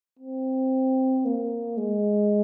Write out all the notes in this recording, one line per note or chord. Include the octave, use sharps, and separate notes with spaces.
C4
A#3
G#3